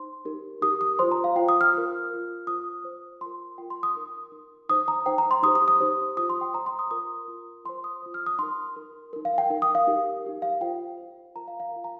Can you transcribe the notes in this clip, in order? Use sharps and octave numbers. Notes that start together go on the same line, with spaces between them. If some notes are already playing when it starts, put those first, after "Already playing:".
Already playing: D#4 C5 C6
D#4 G4 A#4
D#4 G4 A#4 D#6
D#6
F4 C5 C6
A#5
F5
F4 C5 G5
D#6
F6
F4 A#4
F4 A#4
F4 C5 D#6
F4 C5
F4 A#4 C6
F4 A#4 G5
C6
D#6
D#4 A#4
D#4 A#4
D#4 C5 D#6
A#5
D#4 C5 G5
A#5
C6
D#4 G4 C5 D#6
D#6
D#6
D#4 G4 C5
F4 C5 D#6
C6
G5
F4 C5 A#5
C6
D#6
F4 A#4 D#6
F4 A#4
F4 C5 C6
D#6
F4 C5
F6
D#6
D#4 A#4 C6
D#4 A#4
D#4 A#4
F5
G5
D#4 A#4
D#6
F5
D#4 G4 A#4
D#4 G4 A#4
F5
F4 C5 G5
F4 C5
F4 A#4 A#5
F5
F5
F4 A#4
A#5